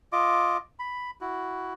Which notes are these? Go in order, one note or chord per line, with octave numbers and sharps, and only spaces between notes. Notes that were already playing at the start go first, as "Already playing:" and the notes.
F4 D#5 D6
B5
E4 F#4